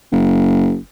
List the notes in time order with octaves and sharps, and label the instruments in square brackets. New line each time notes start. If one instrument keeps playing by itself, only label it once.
[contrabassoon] F#1